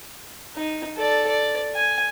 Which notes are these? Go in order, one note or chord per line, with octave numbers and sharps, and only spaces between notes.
D#4
A4 D5
D5
G#5